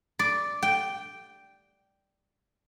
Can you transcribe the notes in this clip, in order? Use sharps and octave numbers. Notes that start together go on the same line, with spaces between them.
D5
G5